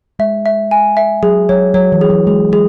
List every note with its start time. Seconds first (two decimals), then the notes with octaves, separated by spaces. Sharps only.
0.19 G#3 E5
0.46 E5
0.71 G#5
0.97 E5
1.23 F#3 G#4
1.49 F#3 C#5
1.74 F#3 C#5
1.92 E3
2.01 G#4
2.10 F#3
2.27 G#3 G#4
2.52 G#3 G#4